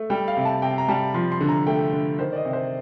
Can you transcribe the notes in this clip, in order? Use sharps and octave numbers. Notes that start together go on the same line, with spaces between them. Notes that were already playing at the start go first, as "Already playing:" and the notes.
Already playing: A3
G3 G5
F5
C3
A5
C3 G5
A#5
G3 A5
F3 C6
C6
D3
A#5
A3 G5
D3
D#3 C5
D5
D#5
C3
C5